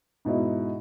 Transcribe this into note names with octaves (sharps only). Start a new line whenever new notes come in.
G#2 B2 B3 E4